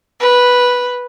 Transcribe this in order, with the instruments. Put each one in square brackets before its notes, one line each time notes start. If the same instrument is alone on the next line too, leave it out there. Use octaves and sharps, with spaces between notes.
[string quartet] B4